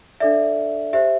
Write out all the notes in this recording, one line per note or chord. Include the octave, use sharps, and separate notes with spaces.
D4 A4 D5 E5
G4 C5 E5